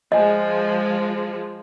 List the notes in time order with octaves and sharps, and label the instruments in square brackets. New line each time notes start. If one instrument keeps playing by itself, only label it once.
[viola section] F3 G#3 [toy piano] D#5 G#5